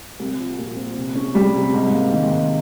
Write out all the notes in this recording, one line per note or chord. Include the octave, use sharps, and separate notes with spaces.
C2
F3
A#2
C4
C3
C#4
G3
C3
G#2
A#3
D#3
G#2